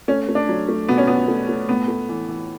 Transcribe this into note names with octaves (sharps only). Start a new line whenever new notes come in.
A3 C#4
A3
D4
F#3
A3
B2 B3
C#4
B2 B3
A3
A3
A2 B3
A3
E3
E3